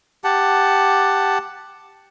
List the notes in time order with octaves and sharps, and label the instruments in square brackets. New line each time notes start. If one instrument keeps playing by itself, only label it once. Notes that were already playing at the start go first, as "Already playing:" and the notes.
[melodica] G4 F#5 A5